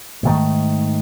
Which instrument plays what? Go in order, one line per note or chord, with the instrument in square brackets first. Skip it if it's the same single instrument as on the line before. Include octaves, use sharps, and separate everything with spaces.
[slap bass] G#2 D#3 A3